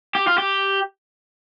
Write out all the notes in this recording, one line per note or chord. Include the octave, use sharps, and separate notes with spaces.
G4
F4
G4